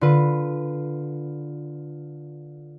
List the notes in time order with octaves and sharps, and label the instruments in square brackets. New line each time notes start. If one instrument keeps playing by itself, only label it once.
[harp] D3 F4 B4